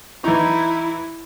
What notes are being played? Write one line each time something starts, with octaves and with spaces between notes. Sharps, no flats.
E3 D#4 E4